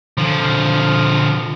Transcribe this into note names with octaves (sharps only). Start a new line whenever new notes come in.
D3 F3